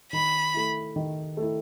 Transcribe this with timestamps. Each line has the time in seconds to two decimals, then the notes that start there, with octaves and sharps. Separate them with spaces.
0.13 D#3 B5
0.54 A3 E4
0.96 D#3
1.37 A3
1.42 E4